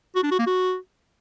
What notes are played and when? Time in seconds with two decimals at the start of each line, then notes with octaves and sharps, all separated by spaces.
0.15 F#4
0.23 D4
0.31 F#4
0.39 A#3
0.47 F#4